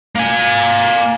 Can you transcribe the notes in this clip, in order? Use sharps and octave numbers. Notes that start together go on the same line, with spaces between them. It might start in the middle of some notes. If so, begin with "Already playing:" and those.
A#3 G#5